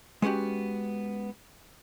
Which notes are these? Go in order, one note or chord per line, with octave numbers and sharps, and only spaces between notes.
G#3 B3 C#4 F#4 G4